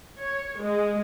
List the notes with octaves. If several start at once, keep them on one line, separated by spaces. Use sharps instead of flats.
C#5
G#3